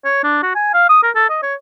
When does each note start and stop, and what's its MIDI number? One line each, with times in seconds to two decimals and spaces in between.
0.05 0.22 73
0.23 0.40 62
0.43 0.55 66
0.55 0.73 80
0.74 0.87 77
0.89 0.99 87
1.03 1.11 70
1.15 1.27 69
1.30 1.40 75
1.43 1.55 73